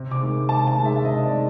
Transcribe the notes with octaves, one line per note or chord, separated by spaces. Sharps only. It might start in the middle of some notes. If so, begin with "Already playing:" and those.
Already playing: C3
D6
D#3 G#3
C3 A5
A5
D#3 G#3
E5
E5
C3 D#5
D5
D#3 G#3